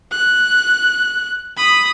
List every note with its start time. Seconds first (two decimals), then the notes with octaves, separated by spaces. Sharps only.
0.12 F#6
1.57 B5 D#6